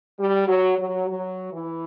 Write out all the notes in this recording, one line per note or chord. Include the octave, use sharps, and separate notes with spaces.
G3
F#3
F#3
F#3
E3